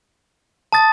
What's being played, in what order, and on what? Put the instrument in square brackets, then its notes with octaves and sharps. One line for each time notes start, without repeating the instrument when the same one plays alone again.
[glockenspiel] A5 D#6 A6